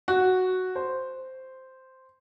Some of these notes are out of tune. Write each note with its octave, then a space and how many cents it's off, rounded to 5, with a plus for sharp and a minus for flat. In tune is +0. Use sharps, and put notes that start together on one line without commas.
F#4 +0
C5 -5